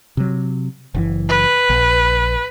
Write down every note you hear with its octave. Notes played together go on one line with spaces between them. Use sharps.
C3 F#3
F#1 C#3 E3
B4
A#1